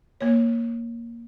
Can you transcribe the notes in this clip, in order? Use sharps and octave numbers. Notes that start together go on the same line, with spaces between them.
A#3 C#5